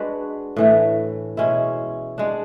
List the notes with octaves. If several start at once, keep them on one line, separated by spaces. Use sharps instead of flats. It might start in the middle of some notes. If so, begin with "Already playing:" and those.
Already playing: G#3 D4 F#4 B4
A2 E3 A3
B2 G#3 C#4 E4
G#3 D4